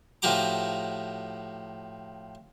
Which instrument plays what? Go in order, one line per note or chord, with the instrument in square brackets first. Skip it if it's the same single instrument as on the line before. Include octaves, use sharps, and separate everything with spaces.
[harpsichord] A2 F3 F#4 G4 A#5 D6